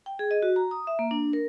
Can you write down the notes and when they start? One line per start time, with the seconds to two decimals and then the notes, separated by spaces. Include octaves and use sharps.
0.06 G5
0.19 G#4
0.31 D#5
0.42 F#4
0.56 A#5
0.71 D#6
0.87 E5
0.99 A#3
1.11 D4
1.33 A#4